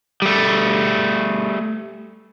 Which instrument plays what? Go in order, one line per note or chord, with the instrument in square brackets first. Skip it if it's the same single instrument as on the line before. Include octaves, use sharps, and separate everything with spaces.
[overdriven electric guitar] G3 A3